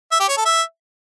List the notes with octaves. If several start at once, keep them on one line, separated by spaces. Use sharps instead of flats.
E5
G4
C#5
A4
E5